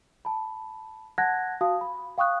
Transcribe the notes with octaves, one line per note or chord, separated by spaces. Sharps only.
A5 B5
F#5 A5 F#6 G#6 A#6
F#4 F5 A5 D#6
B5
F5 G5 C#6 D#6 F#6